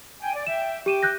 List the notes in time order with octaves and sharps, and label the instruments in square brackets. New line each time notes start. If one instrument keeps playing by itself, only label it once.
[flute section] G5 G#5
D5
[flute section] E5 G5 [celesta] E7
[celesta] G4 D#7 E7 [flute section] G5 D6
[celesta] F#6 G6 A#6